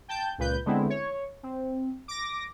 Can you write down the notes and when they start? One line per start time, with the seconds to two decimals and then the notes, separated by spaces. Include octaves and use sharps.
0.08 G5 A5 G6
0.38 C#2 A#2 B4 G6
0.66 D3 G#3 B3 C4 E4
0.90 C#5
1.43 C4
2.08 D6 A#6